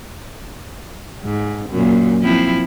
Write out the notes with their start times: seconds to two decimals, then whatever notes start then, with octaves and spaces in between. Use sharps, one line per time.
1.24 G#2
1.70 F#2 A#2
2.23 F3 C4 E4